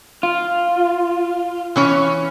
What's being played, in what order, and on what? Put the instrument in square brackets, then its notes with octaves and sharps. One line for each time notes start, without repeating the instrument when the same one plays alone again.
[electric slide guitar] F4
[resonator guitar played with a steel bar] E3 C#4 C#5